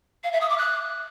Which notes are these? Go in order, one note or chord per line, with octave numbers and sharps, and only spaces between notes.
F5
E5
D#6
D6
F#6